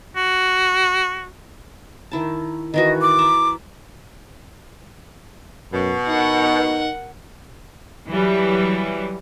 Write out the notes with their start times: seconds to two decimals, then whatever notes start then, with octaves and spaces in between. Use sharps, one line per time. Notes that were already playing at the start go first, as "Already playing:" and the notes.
0.16 F#4
2.11 D#3 E4 A5
2.74 D#3 E3 F#4 D#5
3.02 D6
3.18 E5 A#5
5.73 F#2 B2
6.08 D#4 A#4 F#5
8.08 E3 F#3 G3